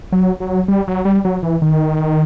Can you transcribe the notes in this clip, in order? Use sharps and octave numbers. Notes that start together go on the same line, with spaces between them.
F#3
F#3
G3
F#3
G3
F#3
E3
D#3